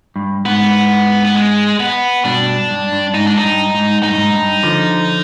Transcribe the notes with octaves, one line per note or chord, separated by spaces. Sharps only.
G2
G#2 B3
B3
G#3
B3
G2 B2 D4
G2
G2
G#2 D#4
D4
D#4
G2
G#2
G#2 D#4
G2
G#2
G2
D3 F3